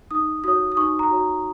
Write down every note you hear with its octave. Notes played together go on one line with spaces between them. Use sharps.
D#4 D#6
F#4 C#5 D#6
D#6
D#4 C#6
A#5
F#4 C#5